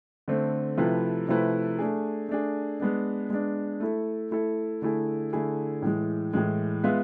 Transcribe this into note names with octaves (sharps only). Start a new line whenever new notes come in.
D3 A3 C4
C3 F3 A3 E4 B4
C3 F3 A3 E4 B4
A3 D4 G#4
A3 D4 G#4
G#3 B3 D4
G#3 B3 D4
A3 E4 A4
A3 E4 A4
D3 A3 E4 G#4
D3 A3 E4 G#4
A2 E3 G#3
A2 E3 G#3
G#3 B3 F4 B4 E5